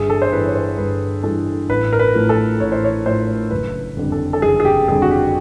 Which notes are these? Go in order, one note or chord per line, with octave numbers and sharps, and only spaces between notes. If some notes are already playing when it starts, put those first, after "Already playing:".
Already playing: G1 G#4
A4
C5
G2 E3 G3 B4
C#5
C5
G1 B4
G2 E3 G3 A4
A1 B4
A#4
B4
A2 F3 A3
A4
A1 C#5
C5
C#5
A2 F3 A3 C5
F#1 B4
F2 D3 G3
A4
A4
F#1 G#4
G#4
G4
F2 D3 G3 G#4
F#4
G4